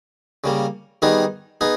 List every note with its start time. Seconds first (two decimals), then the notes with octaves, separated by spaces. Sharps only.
0.44 C#3 G3 A#3
1.02 D#3 G3 B3 D#4 G#4
1.61 B3 D#4 G#4